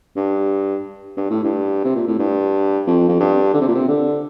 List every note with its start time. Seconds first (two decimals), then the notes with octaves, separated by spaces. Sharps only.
0.16 G2
1.17 G2
1.30 A2
1.44 G2
1.84 C3
1.96 A#2
2.07 A2
2.19 G2
2.87 F2
3.08 F2
3.20 G2
3.54 D3
3.61 C3
3.68 A#2
3.75 C3
3.88 D3